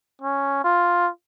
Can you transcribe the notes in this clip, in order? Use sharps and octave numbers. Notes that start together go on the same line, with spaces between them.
C#4
F4